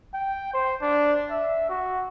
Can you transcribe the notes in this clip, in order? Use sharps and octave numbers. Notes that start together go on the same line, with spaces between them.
G5
C5
D4
E5
F#4